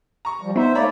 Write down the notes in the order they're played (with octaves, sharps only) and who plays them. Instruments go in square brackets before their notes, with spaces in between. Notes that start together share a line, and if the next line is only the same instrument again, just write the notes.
[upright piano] A#5 C#6
[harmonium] F3 G3
[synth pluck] B3 D#4 [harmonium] C5 E5
[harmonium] A3 A#3 D5 [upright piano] C#5 A#5 B5